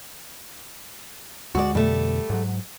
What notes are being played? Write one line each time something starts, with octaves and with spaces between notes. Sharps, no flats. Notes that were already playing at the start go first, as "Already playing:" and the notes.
D2 G#3 F#4 D5
F2 B2 D3 G3 A3
G#2 F#3